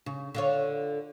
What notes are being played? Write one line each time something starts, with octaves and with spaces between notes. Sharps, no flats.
C#3
D3 F4 C#5